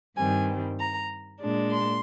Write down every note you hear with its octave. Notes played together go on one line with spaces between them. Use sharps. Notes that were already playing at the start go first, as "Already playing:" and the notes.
G2 D#3 G3 C4 G#5
A#5
A#2 G#3 D4
C6